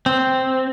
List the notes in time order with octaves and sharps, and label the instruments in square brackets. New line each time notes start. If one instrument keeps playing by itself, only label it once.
[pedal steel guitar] C4